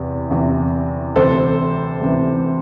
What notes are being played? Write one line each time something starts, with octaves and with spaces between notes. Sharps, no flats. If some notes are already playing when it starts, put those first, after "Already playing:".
Already playing: E2 C3 E3 G4
E2 C3 E3
D2 C3 E3 A4 C5
D2 C3 E3